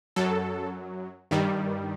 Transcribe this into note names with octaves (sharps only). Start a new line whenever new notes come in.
F#2 F#3 A4
G2 D#3 G3